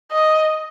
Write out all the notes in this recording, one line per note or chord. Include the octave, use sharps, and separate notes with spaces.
D#5